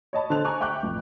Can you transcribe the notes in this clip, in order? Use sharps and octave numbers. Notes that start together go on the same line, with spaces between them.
C#5 D#5 A5 B5
D3 C5 A5 F#6 F7
G#5 A#5 C#6 D6 F#6
E5 G5 C#6 D6 F#6 G6
A1 F2